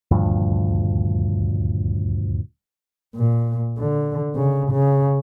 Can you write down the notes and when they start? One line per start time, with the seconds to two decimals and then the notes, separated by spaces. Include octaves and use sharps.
0.11 D#1 D2 G2 F3
3.16 A#2
3.78 D3
4.36 C#3
4.72 C#3